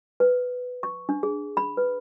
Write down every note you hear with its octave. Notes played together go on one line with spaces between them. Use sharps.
B4
C#6
D4
G#4
B5
B4